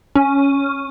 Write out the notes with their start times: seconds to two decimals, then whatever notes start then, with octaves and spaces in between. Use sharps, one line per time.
0.16 C#4